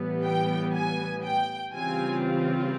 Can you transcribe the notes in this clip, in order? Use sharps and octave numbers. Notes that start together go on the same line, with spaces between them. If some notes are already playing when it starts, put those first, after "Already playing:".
Already playing: A2 E3 G3 B3
G5
G#5
G5
C#3 E3 G3 C4 F4 G#5